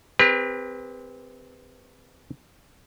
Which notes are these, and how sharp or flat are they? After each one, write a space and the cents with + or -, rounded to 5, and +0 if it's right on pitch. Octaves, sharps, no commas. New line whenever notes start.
C4 -20 G4 +35 B4 -25